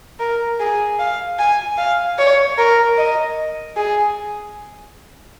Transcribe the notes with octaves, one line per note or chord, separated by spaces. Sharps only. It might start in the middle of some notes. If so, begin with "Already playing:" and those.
A#4
G#4
F5
G#5
F5
C#5
A#4
D#5
G#4